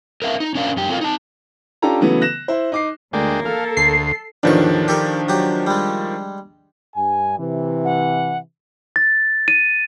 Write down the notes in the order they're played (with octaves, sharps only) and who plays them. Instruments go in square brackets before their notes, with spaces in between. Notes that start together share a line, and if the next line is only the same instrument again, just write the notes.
[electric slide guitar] A#4 B4 E5 F5
D#4
C#4 D4 A#4 C5 D5 F5
F#2 G4
C4 F4 A4 A#4 D#5 F5
D#4 A5
[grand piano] C#4 D4 F4 G4 A4 A#5
C#3 E3 F#3 A3 B3
F#6 A#6 E7
E4 C5
D#4 D6 C7
[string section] D2 [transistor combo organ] G#3 D4 G5 [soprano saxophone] A#3
[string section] A4 [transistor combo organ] F5
[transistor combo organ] D2 [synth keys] C7
[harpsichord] A1 E2 C#6 [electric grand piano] D#3 F3 D4
[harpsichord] G4 A4 A#4
F#3 G4
G3 G#3
[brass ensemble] G2 G#5
C3 E3
[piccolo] F#5
[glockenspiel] A6
D#7